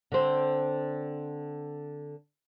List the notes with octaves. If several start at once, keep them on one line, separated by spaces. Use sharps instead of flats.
D3 C4